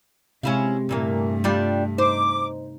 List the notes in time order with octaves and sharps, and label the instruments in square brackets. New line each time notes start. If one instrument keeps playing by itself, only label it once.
[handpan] C3 [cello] G#3 [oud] C#4 E4 F5
[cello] G2 A3 [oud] A#2 E3 A#3
[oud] G3 D4 F4
[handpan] D#4 [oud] C5 [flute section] D6